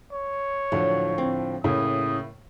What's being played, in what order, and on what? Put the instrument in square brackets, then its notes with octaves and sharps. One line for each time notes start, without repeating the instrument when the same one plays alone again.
[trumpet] C#5
[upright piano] A2 D3 F3 [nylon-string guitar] F#3
[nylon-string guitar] C4
[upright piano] A2 C#3 [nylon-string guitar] A#3 E4 [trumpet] D#6